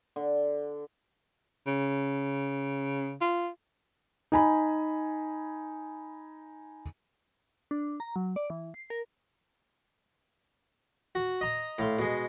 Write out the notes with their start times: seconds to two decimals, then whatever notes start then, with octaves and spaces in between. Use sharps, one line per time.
0.16 D3
1.67 C#3
3.21 F4
4.32 D#4 G#5 B5
7.71 D4
8.00 A#5
8.16 F#3
8.36 D5
8.50 E3
8.74 C7
8.90 A#4
11.15 F#4
11.41 D#5 A#5
11.79 A2 F5 C6
11.99 B2 G#3